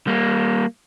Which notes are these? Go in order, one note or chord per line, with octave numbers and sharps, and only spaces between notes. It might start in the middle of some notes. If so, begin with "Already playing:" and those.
G3 A#3